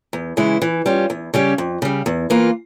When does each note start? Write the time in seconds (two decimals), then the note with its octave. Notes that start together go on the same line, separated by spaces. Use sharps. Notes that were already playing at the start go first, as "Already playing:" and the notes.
0.13 E2
0.37 C#3 E3 G#3 E4
0.62 E3
0.86 G3 C#4 F4
1.10 E2
1.34 C#3 G3 C#4 G4
1.58 F2
1.82 C#3 G3
2.06 E2
2.30 E3 A#3 F4